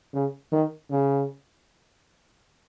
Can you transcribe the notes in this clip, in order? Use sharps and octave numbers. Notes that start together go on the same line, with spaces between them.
C#3
D#3
C#3